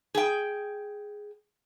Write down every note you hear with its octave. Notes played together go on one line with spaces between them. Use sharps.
G#4 G5